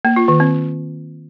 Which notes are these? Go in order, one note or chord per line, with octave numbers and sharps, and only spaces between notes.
A#3
F4
D#3
C4